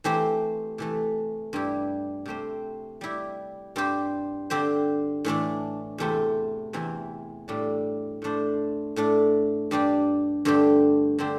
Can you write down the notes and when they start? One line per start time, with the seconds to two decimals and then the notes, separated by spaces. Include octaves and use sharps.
0.04 E3 A3 C4 G4 C5
0.78 C3 E3 A3
1.53 G2 G3 E4 G4
2.26 C3 A3 C4 G4 C5
3.01 G3 E4 G4
3.76 G2 G3 C4 G4 C5
4.50 D3 C4 G4 C5
5.25 A2 E3 A3 D4
5.98 E2 C3 A3 C4
6.73 E2 C3 E3 C4 E4
7.48 A2 G3 D4
8.22 A2 A3 D4 C5
8.96 A2 A3 D4
9.71 G2 G3 D4 G4
10.45 G2 D3 A3 C4 G4
11.19 D3 C4 G4 C5